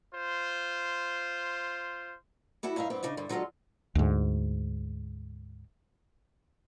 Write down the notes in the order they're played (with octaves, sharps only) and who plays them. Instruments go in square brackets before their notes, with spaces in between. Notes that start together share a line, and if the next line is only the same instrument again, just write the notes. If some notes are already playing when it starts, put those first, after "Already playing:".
[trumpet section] F4 C5
[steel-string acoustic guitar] G3 E4 F#4 A4
G2 D#4 E4 E5 F5
G2 B3 C4
C#3 D4 D#4 D#5
G2 D3
D3 F#3 G#3 F4 A4
[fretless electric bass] D2 G#2